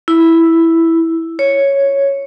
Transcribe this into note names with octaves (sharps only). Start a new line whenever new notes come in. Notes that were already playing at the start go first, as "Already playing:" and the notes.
E4
C#5